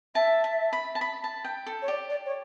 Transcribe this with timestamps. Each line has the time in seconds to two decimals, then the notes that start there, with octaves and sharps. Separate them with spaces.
0.15 E5 A5
0.44 A5
0.73 B5
0.95 A5
1.01 B5
1.24 A5
1.45 G5
1.67 A4
1.82 C#5
1.88 G4 D5
2.10 D5
2.26 C#5